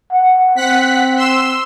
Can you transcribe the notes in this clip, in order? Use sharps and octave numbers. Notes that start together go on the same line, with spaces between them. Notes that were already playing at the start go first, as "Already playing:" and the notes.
F#5
C4 F#5 F#6 B6
C6 E6 E7